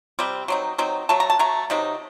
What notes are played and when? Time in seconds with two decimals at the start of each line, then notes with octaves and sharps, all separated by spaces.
0.19 C3 G3 C4
0.48 F#3 C4 D#4
0.78 F#3 C4 D#4
1.09 F#3 A3 A5
1.20 A#5
1.30 A5
1.39 F#3 A3 A#5
1.70 C3 F#3 C4 D#4